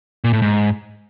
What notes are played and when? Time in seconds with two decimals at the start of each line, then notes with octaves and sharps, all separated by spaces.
0.24 A#2
0.33 A2
0.42 G#2